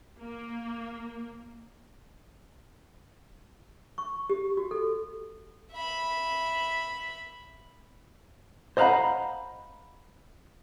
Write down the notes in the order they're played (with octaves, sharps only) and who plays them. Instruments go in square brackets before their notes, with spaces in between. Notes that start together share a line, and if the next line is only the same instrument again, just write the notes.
[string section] A#3
[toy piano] C#6
G4
F#4
A4
[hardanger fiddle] E5 B5
[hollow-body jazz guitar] C5 D#5 F5 F#5 A#5 B5